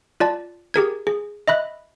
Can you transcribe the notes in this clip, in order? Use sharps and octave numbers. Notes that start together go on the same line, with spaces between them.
F4 D5 A5
G4 G#4 A#4 G#6
G#4
D#5 E5 B5 F#6